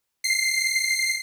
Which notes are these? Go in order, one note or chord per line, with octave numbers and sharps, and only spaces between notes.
C7